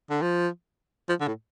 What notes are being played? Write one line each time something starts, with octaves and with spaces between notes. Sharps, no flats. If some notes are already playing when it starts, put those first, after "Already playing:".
D3
F3
F3
D3
A2